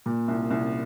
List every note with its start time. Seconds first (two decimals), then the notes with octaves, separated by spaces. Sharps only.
0.06 A#2
0.28 C2
0.50 C2